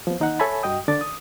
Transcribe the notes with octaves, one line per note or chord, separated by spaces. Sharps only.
F3 B3
D#2 D#4 D#5 F#5
A4 C#5 E5 G#5 A5 B5
G2 F#4 D#5 G5 D#6
D3 D4 D6 A6
D#6